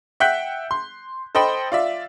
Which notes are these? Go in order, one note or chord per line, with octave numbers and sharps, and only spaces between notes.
E5 F#5 G5 F#6 G6 B6
C6
A4 C5 D#5 G5 B5
F4 D5 E5